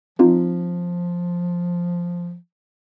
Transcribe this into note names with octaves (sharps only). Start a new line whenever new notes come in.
F3 C4 D#4 F4